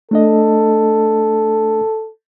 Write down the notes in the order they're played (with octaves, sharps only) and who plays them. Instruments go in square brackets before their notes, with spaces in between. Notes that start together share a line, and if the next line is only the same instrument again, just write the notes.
[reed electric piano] A3 D4 D#5 [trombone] A4